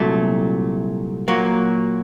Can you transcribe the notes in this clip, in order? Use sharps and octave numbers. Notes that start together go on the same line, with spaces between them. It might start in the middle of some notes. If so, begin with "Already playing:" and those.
Already playing: C2 A#2 F#3 A3
A#2 F#3 A#3 F#4